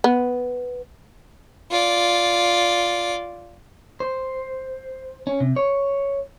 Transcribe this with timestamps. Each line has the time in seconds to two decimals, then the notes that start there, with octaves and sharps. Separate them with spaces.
0.04 B3
1.71 F4 D5
4.00 C5
5.27 C#4
5.40 C3
5.56 C#5